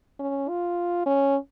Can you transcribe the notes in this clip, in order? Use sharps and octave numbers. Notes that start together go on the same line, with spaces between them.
C#4
F4
C#4